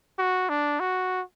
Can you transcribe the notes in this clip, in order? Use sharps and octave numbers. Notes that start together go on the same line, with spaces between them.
F#4
D4
F#4